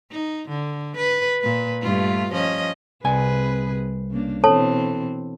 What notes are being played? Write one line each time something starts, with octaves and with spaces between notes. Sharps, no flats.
D#4
D3
B4
A#2 B4
G2 A3 F4
F3 C#4 D#5
C2 C3 G#4 B4 G#5
C#3 A#3 D4
B2 E3 C4 A4 C#5 A5